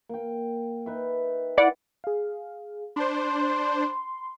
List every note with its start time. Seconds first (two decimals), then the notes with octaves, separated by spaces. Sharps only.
0.09 A#3 G5
0.86 D#4 B4 E5
1.57 E4 D5 F#5
2.04 G#4 F5
2.96 D4 C5 B5 C6